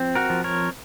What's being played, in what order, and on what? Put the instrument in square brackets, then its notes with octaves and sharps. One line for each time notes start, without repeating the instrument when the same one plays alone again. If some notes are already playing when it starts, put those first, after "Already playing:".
Already playing: [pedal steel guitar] F3 C4
F#4 A#4
F3
A#4 C#5